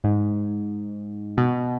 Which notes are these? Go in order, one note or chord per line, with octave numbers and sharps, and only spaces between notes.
G#2
B2